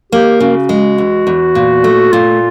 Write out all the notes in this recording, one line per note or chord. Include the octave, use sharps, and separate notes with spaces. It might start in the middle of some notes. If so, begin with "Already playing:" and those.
A#3 G4
C#3 F#4
G#3
E2
E2
A#2
A3
A#2 F4